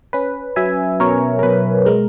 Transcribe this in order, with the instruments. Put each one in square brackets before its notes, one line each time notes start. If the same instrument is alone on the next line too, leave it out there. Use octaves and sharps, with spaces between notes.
[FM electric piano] C#4 B4
F#3 E5 G#5
B2 A#4 C#5
A#4
B2 B4
G#3 A#4